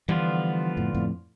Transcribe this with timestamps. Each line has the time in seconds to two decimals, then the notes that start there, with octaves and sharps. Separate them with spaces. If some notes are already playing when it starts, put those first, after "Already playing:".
0.08 D3 E3 F3 G3 B3 F4
0.77 F2 A2
0.94 F2 A2